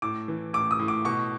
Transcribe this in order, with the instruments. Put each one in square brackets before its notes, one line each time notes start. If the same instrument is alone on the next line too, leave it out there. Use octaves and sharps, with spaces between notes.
[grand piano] A2 D6
E3
A2 D6
D#6
A2
D6
B2 C#6